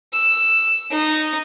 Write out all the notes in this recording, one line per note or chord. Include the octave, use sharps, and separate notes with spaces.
E6
D#4